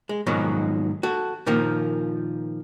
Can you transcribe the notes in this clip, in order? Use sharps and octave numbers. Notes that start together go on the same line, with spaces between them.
G#3
G#2 B2 D#3 F3 F#3
F#4 A4
A#2 D#3 F3 A#3